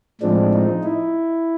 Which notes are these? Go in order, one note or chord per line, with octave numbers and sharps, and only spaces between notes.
A2 F3 G#3 C4 D4
D#4
E4